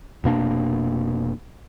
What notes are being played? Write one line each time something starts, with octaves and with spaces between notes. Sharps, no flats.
F1 B2 A#3 D4